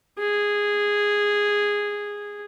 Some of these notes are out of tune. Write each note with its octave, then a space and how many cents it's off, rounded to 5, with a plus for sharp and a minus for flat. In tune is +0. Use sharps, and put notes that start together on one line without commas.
G#4 -10